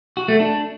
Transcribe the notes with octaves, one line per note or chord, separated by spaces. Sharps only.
F#4
A3
D4